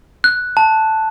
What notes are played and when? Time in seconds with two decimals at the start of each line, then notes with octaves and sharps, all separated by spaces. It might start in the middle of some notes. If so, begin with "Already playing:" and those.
0.24 F#6
0.57 A5